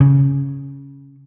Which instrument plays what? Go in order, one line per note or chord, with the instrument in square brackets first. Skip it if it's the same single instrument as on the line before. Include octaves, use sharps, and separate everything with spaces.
[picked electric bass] C#3